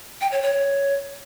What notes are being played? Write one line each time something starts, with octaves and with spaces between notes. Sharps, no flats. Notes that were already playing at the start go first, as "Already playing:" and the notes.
G5
C#5
C#5